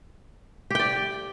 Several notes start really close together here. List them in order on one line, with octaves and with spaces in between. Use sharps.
G4 G5 D5